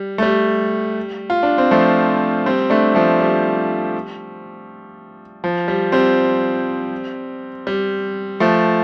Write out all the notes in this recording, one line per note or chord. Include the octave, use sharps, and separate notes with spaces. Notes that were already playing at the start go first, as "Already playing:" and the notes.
Already playing: G3
A3
G3
F4
D4
C4
F3 A3
G3 C4
A3 D4
F3 A3
G3
F3
G3
G3 C4
G3
F3 A3